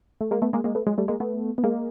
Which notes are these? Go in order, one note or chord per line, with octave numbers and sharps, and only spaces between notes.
A3
G#3 A#3
A3 B3
G#3 A#3
G#3 A#3
A3 B3
F#3 G#3
G3 A3
G#3 A#3
A3 B3
B3
G#3 A#3